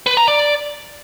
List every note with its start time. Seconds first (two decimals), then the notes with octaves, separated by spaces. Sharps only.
0.06 B4
0.17 A#5
0.28 D5